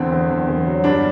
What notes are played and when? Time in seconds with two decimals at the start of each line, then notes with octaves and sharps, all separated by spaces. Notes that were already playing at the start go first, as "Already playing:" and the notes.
Already playing: E2 D3 C4
0.12 E2
0.30 E2
0.48 E2
0.66 F#3
0.84 G2 D4